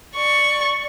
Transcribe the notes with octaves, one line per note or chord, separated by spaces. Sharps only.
D5 C#6